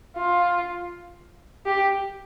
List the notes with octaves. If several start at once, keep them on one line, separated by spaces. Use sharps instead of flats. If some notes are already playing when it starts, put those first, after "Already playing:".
F4
G4